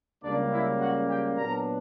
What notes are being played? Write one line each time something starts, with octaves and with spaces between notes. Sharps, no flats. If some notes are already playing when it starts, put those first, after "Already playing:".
C#2 C#3 G3 A#3 D4 D5
E4 E5
F#4 F#5
G4 G5
A#2 F#3 B3 D4 A#4 A#5